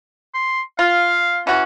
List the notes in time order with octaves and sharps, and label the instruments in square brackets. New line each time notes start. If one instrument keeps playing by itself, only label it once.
[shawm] C6
[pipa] F4 [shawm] F5
[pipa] E3 F#4 [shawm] C#4